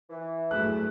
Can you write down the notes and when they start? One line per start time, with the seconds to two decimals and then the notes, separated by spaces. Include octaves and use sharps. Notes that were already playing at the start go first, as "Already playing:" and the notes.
0.10 E3
0.51 G2 F#3 A3 E4 G#4 F#6